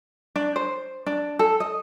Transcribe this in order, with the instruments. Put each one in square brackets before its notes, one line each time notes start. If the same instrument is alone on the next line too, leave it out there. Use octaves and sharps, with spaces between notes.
[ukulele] D4
C5
D4
A4
D#5